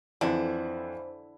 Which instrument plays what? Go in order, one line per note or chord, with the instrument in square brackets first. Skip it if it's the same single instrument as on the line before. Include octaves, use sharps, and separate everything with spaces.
[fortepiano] F2 E3 [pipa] D3 E4 [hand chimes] C5